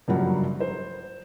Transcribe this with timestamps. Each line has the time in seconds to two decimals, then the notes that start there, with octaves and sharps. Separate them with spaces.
0.08 F#1 G2 F3 F#3 F#5
0.60 C5